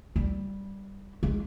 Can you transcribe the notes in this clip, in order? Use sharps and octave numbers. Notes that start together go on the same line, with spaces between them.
G3
G#3